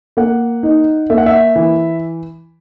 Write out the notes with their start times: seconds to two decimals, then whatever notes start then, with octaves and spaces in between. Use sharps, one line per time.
0.17 A#3 F#5
0.63 D#4
1.10 A#3 E5
1.18 F#5
1.26 E5
1.56 E3